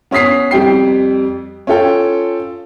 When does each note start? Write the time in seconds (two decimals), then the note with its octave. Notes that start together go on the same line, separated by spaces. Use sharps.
0.11 B3 C#4 D#6 B6 C7
0.51 F2 G3 G5 C7
1.67 C#4 F4 A4 G5